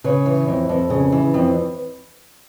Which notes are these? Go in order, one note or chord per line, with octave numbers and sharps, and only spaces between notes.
C#3 B4 C#5
E3
F2
F2
C#3
E3
F2